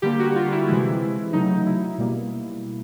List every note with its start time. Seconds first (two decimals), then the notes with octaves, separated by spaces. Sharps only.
0.02 D3 G3 A#3 G4
0.19 F#4
0.36 F4
0.52 E4
0.68 C3 E3 G#3 E4
1.33 C#3 F#3 A3 D#4
1.66 E4
1.98 B2 G3 A#3